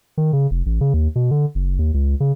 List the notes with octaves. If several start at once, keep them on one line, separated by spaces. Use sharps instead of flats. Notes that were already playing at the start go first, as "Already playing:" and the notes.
D#3
C#3
F1
A1
C#3
D#2
B2
D3
F#1
D#2
C#2
C#3